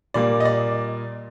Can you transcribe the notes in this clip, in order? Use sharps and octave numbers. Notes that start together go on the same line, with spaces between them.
A#2 G3 A#3 D5
D#5
D5